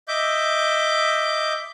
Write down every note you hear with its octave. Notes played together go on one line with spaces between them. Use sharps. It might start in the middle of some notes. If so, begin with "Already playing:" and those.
D#5 E5 D6 G6